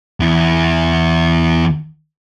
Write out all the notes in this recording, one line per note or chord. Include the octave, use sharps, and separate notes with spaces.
E2 E4